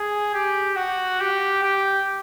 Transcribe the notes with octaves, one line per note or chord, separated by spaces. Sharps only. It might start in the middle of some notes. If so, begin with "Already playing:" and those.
Already playing: G#4
G4
F#4
G4
G4